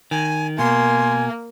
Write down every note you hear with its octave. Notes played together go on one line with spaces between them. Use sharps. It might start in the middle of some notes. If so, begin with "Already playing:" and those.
D#3 G#5
B2 A#3 G#5 C6